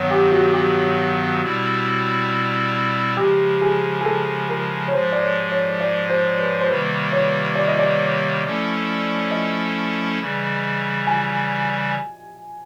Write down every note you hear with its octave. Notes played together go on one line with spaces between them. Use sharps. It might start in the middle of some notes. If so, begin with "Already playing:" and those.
Already playing: G2 D#3 F#3 B3 C#5
G4
F#4
G4
B2 G3 C4 E4
C#3 F3 G#3 G4
G#4
G#4
A4
A#4
C#5
G#2 F3 G#3 C5
D5
C#5
C#5
D5
C5
B4
C5
C3 D#3 G3 A#3 B4
C#5
D5
D#5
D5
F3 A3 C#4 E4 A4
D#5
C#3 E3 G3
G#5